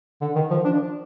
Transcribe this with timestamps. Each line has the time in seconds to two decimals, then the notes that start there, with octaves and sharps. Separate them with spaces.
0.21 D3
0.35 D#3
0.50 F3
0.65 D4